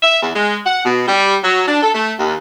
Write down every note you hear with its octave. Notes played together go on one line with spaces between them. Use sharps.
E5
E2
G#3
F#5
B2
G3
F#3
D4
A4
A3
D#2